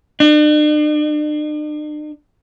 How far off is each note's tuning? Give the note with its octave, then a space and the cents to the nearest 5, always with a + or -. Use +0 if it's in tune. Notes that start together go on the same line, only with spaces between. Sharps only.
D4 +45